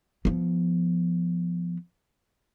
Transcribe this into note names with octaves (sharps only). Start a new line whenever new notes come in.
F3 B3